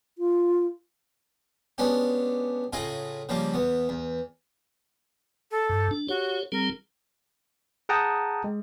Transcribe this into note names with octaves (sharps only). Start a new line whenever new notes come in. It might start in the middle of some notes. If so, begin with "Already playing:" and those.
F4
G#3 B3 C#4 D4 G4
A2 C#3 F4 G#4 D#5
C#3 F3 G3 A#3
E2 B3
E2
A4
G2
D4
F#4 G4 C#5
G3 C4 G#4 A#4
G#4 F#5 G5 A5 A#5 D#6
G#3